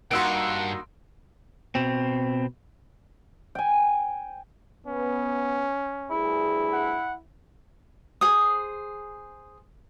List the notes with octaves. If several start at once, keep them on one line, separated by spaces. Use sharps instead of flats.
G2 A#3 D#4 F#4 F#5 C6 E6 D7
B2 C4
G5 G#5
B3 C#4
D2 G2 E4 G#4
F#5
G#4 C5 D#6